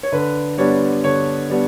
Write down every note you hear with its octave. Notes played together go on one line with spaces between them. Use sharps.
C#5
D3 B4
G3 B3 D4 C#5
D3 C#5
G3 B3 D4